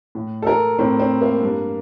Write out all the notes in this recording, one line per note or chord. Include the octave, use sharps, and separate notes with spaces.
A2
A4
A#4
A2 C4
C4
A#3
G2